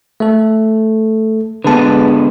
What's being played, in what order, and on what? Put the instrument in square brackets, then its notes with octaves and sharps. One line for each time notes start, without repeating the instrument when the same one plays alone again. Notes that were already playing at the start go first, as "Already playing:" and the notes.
[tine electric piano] A3 A4
[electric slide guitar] D3 G#3 B3 [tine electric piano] B4 A5